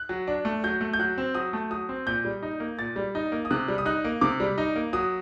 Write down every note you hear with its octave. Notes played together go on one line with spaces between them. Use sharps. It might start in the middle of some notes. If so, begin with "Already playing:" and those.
Already playing: F#6
F#3
D4
A3
F#3 G6
A3
G6
F#3 F#6
C4
F#3 D#6
A3
F#3 D#6
C4
A#2 G6
G3
D#4
A#3
A#2 A6
G3
D#4
A#3
D#6
C3 F#6
G3
D#6
D#4 F#6
A#3
C3 D6
G3
D#4
A#3
F#3 D#6